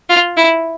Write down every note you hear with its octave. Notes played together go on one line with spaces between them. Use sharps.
F4
E4